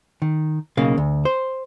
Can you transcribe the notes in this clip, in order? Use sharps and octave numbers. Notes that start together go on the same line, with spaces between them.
D#3
B1 C#3 A#3 F5
D2
C5